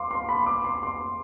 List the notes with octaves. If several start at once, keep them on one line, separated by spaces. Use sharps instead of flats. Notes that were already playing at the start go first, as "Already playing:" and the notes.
Already playing: F5 C6 D6
C6
B5
D6
C6
C6